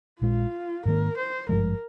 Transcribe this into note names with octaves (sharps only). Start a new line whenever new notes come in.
A#1 A#2 G#3 F4
G#2 D#3 A#3 A#4
C5
G#1 G2 F3 G#3 A#4